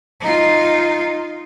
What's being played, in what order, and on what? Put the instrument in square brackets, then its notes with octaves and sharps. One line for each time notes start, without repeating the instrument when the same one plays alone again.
[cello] D#4 F4